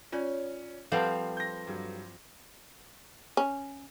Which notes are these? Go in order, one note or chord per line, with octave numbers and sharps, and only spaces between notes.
C#4 F4 C#5 D5
F3 G3 C4 A4 B4 F5 F#5 A5
G6 A#6
G2 F#3
C#4